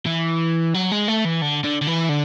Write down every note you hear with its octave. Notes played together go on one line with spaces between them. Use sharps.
E3
F#3
G#3
A3
E3
D3
D3
D3
E3
D3